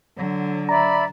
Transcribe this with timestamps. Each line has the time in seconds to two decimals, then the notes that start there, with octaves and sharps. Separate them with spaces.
0.17 D3 F#3
0.69 D5 E5 A#5 B5